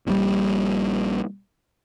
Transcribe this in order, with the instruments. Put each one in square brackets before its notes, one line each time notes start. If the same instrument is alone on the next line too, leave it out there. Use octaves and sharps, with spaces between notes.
[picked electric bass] A#1 A#2 D3 G3